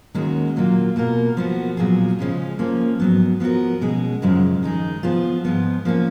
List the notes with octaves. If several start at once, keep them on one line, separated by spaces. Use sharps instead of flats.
D#2 D#3 G#3 C#4 F#4
A#2 F#3 A#3 F4
B2 A#3 F4 A#4
F3 B3 F#4
A#2 F#3 B3 F4 G#4
C#3 F3 G#3 C#4
F3 A#3 C#4
G#2 F#3 B3
F3 B3 F#4 A#4
B2 G#3 C#4 G#4
F#2 C#3 F3 G#3
D#3 G#3 D#4 G#4
F3 B3 F4 G#4
G#2 F3 B3 F4
F3 A#3 C#4